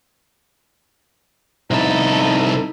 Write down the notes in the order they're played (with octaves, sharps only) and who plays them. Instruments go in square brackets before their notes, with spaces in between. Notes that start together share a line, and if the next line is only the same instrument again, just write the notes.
[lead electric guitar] C2 A4 [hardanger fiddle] D#4 E4